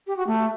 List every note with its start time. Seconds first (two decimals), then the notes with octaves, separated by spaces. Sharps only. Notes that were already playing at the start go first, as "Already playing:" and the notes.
0.07 G4
0.17 F#4
0.27 A3